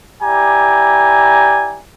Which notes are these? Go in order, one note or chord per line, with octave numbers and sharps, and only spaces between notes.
E4 G4 D5 G#5 A#5